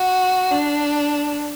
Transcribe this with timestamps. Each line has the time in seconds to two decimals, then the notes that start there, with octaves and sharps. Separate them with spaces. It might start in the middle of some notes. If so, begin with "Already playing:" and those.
Already playing: F#4
0.50 D4